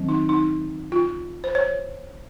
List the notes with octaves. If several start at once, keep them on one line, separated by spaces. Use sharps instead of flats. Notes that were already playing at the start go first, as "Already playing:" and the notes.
Already playing: D#3 F#3 C4
D#4
D#4
F4
C5
C#5